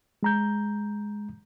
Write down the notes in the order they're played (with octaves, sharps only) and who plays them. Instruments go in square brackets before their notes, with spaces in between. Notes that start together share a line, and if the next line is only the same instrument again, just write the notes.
[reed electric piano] G#3 A#5 G6